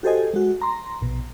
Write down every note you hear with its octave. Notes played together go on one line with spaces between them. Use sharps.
F#4 G4 A4 C5 D#5 G#5
G#3 F#4
A#5 C6
A#1 B2